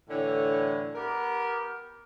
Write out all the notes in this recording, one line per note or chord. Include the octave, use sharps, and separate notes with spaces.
A2 D3 E3 C#5
B3 G4 A#4